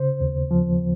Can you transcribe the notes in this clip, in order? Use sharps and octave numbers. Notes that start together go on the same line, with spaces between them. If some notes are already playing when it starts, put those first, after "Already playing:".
Already playing: C#3 C5
D#2
F3